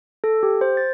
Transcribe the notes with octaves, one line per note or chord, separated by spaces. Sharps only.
A4
G4
C5
A6